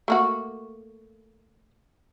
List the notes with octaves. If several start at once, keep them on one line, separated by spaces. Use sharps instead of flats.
A3 A#3 F#4